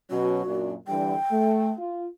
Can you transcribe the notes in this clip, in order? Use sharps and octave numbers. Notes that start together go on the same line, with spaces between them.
B2 F#3 C#4 F#4
F#2 A#2 D4
D3 E3 G3 G5
A3
F4